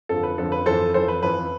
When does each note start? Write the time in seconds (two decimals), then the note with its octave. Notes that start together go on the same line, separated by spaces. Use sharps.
0.09 F2 D3 F3 A4
0.23 B4
0.38 F2 D3 F3 A4
0.52 B4
0.66 F2 E3 A4 C5
0.94 F2 E3 A4 C5
1.08 B4
1.22 F2 E3 B4